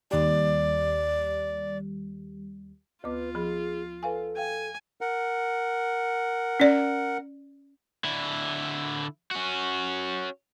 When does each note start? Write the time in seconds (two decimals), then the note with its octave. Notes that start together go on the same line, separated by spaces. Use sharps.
0.11 D#2 G3 D5
3.04 D2 B3 F4 B4 D6
3.35 F3 G#4 B5
4.03 A4 B4 F5 G#5
4.37 F5 G5 G#5
5.01 A#4 F#5
6.60 C#4 D5
8.04 D3 E4
9.31 C#4 F#4